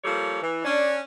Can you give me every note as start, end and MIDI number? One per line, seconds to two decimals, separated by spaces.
0.04 0.41 53
0.04 0.41 55
0.04 0.41 58
0.04 0.41 69
0.04 0.41 73
0.42 0.63 52
0.65 0.99 61
0.65 0.99 62